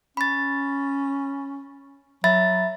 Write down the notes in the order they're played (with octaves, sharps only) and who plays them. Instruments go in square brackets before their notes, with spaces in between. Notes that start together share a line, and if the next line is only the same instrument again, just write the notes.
[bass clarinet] C#4 [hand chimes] B5 A6
[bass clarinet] F#3 [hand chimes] E5 B5 A6